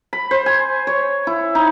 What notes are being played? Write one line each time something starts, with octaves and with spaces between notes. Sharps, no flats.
B5
C5
G#5
C#5
E4
D#4